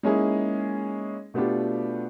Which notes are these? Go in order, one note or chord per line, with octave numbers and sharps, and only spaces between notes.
G#3 A#3 C#4 D#4 E4 G#4
B2 A3 B3 D4 F4 G4